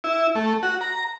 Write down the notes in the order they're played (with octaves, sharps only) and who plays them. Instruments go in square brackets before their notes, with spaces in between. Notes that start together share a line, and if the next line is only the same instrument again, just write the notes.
[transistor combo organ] E4
A3
F#4
A#5